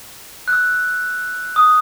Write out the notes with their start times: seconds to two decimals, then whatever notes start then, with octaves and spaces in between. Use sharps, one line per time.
0.48 F#6
0.53 E6
1.56 D#6